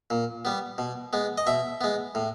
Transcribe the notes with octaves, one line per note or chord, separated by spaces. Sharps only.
A#2
G3 B3
B2
G#3 B3
D#5
B2 E5
G#3 B3
A2